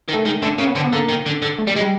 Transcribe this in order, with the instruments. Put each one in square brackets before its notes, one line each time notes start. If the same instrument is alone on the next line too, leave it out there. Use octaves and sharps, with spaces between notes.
[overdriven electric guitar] D#3
[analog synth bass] A3
[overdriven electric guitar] D#3 [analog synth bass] G#3
[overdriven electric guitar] D3 [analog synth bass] A3
[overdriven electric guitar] C#3 [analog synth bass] A#3
[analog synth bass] B3
[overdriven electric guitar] D3 [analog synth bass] C4
[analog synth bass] B3
[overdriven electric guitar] D3 [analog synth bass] A#3
[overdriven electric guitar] D#3
D3
D3
[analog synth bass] A3
[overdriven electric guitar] G3
G#3
[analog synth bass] G3